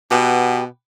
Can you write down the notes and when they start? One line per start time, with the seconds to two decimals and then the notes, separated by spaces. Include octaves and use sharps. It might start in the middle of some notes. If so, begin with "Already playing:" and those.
0.11 B2 G4 B4 F#5